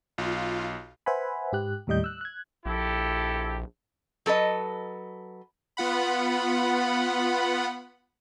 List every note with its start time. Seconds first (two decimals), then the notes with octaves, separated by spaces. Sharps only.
0.18 B1 F4
1.06 B4 C5 E5 F#5 G#5 B5
1.52 G#2 G4 F#6
1.87 D#2 A2 G3 D#5 G6
2.04 E6 F#6
2.21 F#6 G#6
2.66 A#1 E4 G4 A4
4.26 F#3 A4 B4 D#5
5.77 B3 F4 F#5 B5